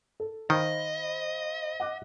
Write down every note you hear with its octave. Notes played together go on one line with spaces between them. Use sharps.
A4
D#3 C5 D#5 F5 B5
F#5 D6 F#6